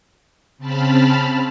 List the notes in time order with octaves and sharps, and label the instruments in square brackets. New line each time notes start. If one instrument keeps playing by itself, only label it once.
[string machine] C#3 C4 A5 B5 F6